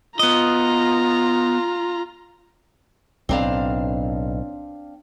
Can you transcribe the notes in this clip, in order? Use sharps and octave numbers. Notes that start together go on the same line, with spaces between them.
B3 F4 D#5 A#5
B1 A2 C4 D4 F5